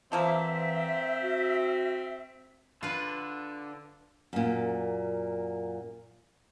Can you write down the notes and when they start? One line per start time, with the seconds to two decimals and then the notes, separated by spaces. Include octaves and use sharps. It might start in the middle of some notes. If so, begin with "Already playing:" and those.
0.12 D3 E3 F3 A#3 C4 E5
1.22 F#4
2.83 D3 F4 B4
4.33 F#2 A#2